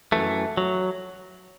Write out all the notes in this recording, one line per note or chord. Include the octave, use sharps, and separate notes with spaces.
F#2 E3 A3
F#3